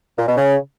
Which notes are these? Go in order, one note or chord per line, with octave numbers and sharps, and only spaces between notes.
A#2
B2
C#3